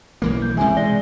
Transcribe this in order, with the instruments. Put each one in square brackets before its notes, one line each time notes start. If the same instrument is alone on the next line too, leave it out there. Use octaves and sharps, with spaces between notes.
[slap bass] B1 E3 A#3
[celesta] G6
[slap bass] C3 E3 G#3 [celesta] E5 G#5
[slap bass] G#3 [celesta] D5 A#6 G7